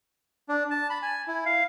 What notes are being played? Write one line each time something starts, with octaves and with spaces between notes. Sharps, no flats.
D4
A5
B5
G#5
E4
F5